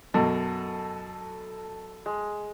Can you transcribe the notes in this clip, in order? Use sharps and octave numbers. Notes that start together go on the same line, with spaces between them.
F#2 B2 A4
G#3